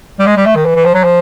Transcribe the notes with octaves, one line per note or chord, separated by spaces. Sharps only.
G3
G#3
G3
A3
D#3
E3
E3
F3
F#3
F3